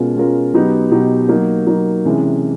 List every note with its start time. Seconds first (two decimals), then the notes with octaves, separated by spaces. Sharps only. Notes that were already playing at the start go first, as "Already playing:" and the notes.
Already playing: B2 G#3 C#4 F4 A#4
0.16 B2 G#3 C#4 F4 A#4
0.53 B2 F#3 B3 D#4 G4
0.91 B2 F#3 B3 D#4 G4
1.29 F#3 A#3 D#4
1.67 F#3 A#3 D#4
2.05 C3 E3 G#3 C#4